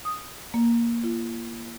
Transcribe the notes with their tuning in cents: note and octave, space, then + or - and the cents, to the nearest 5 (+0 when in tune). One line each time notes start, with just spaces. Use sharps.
D#6 -5
A#3 +5
F4 -40